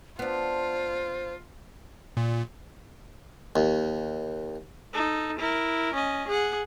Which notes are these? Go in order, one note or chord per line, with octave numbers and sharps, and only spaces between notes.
B3 D4 F4 C5
A#2
D#2
D#4 A4
E4 A#4
C#4 D#5
G#4 F#5